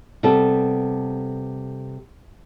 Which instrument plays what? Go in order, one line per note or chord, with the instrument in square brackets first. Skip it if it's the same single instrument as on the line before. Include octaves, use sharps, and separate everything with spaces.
[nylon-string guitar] C3 G3 B3 A4